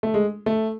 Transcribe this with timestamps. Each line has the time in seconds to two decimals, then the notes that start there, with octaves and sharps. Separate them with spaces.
0.03 A3
0.14 G#3
0.46 A3